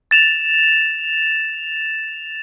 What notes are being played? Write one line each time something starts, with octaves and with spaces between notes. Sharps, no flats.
A6 E7 F7